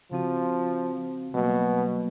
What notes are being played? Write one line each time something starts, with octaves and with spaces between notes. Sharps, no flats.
C#3 F3 C4 F#4
B2 F#3 G3 A#3